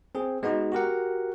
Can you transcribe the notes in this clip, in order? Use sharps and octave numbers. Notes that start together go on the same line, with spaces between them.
C4 G#4
G#3 B3 D#4 F#4
F#4 G4 A#4 F#5